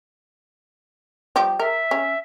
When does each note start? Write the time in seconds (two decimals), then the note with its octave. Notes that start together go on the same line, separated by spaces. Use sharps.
1.36 F3 G3 G4
1.59 A#4 E5
1.91 C#4